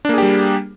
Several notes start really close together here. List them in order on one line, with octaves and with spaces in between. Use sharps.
D4 A#3 G#4 G4 G3